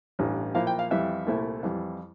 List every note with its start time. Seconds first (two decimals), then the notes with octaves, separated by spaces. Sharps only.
0.19 A1 G2 E3
0.54 A#2 F3 A#3 E4 F5
0.67 G5
0.79 F5
0.91 F2 E3 G3 E5
1.26 C2 A#2 A3 E4
1.63 F2 E3 G3